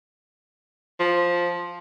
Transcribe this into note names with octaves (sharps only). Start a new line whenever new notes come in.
F3